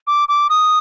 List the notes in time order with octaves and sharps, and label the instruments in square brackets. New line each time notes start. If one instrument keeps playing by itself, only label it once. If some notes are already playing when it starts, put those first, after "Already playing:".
[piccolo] D6
D6
D#6